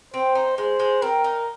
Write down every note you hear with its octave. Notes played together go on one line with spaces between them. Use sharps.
C4 C5
D#4
G#3 C5
G#3
C4 A#4
D#4